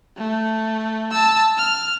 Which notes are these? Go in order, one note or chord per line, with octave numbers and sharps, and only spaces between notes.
A3
A5 E6
F6